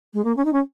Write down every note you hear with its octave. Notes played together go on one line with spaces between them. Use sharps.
G#3
A#3
C#4
D#4
C#4